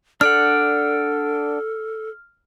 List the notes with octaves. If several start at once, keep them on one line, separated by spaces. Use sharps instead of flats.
D4 A4 D5 F#5 F6